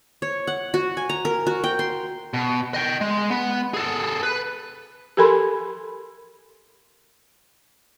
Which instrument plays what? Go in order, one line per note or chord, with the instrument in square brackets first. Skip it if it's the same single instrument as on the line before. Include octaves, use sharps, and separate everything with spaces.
[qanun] C#5
F#5
F#4
G#5
A#5
A#4
F#4
G5
C6
[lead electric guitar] B2
D#5 G5
G#3
B3
G#4 A4
B4
[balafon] G4 A4 A#4 G#5 B5 C6